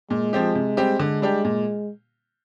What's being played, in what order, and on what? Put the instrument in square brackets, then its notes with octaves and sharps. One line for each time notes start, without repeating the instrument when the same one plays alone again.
[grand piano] A#2 [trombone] G#3
[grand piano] F3 C4 G4
C3
G3 C4 G4
[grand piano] D3 [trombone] G#3
[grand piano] G3 D4 G4
A#2